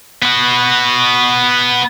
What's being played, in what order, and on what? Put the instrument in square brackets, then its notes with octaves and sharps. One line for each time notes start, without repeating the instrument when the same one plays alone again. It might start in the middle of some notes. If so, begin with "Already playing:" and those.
[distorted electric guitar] B3 F#4